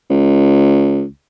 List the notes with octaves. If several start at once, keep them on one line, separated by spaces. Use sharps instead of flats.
C#2